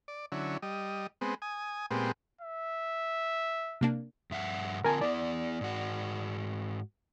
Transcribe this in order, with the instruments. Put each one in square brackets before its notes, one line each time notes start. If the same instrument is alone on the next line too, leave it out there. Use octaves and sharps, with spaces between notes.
[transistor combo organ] D5
D3 F#3 C#4 E4
G3 D#5
G#3 B3 C4
G#5 D#6
A#2 G#3 B3 C4 G4
[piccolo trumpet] E5
[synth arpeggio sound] C3 A#3 D4
[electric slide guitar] G2 E5 F#5
[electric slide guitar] D3 C4 F4 [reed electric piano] A#4 G#5 A5
[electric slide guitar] B3 E4 [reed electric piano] D5
[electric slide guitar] G#2 F#4